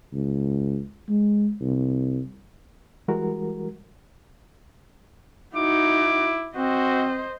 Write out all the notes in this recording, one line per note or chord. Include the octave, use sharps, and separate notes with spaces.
C#2
G#3
C2
E3 G3 G#3 F#4 A#4
D#4 E4 F#4 D6
C4 F#4 C5 D#5